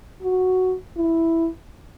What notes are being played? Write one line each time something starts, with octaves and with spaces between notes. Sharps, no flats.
F#4
E4